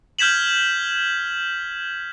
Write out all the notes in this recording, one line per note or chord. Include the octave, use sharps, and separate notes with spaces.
F6 G6 G#6 B6 E7 F#7